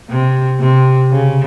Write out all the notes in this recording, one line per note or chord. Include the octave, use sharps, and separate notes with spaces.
C3
C3
C#3